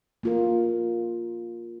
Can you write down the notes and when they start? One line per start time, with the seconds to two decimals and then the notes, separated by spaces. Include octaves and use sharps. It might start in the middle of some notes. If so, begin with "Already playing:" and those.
0.23 A#3 F4 A#4